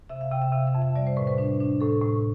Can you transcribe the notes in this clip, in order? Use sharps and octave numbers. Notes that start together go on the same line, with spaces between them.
C3 E5
F5
C3 G5
E5
C3 F5
E5
F2
E5
G3 D5
C5
A2 B4
B4
D4
D4
A2 A4
A2